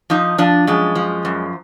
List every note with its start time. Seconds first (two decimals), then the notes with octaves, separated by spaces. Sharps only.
0.10 F3 D#4
0.38 F3 D4
0.67 F#2 G#3
0.95 F3
1.25 F#2